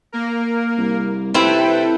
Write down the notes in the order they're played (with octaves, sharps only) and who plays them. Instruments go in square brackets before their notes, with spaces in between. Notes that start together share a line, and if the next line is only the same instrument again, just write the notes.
[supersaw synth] A#3 A#4
[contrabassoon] C2
[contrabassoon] C3 [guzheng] C4 E4 [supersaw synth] A4 B4 G5